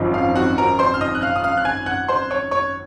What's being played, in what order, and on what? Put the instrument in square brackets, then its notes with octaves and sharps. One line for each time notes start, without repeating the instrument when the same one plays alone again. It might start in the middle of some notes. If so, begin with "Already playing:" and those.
Already playing: [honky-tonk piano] G#1 F#2 F3 C4 D#4
[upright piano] F5
F#4 F#5
A#4 A#5
C5 C6
F6
D#5 D#6
F#6
F5 F6
D#6
F5 F6
F#6
G#5 G#6
F#5 F#6
C5 C6
C#5 C#6
C#5 C#6